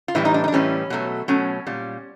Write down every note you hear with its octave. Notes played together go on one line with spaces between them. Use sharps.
F4
A2 E3 G3 E4
D#4
D4
D#4
D4
A2 E3 G3 C#4
B2 F#3 A3
B2 F#3 A3 C#4
A#2 G3